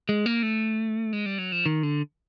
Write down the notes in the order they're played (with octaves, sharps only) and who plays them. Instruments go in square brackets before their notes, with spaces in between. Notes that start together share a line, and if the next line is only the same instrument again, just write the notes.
[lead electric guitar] G#3
A#3
A3
G#3
G3
F#3
F3
D#3
D3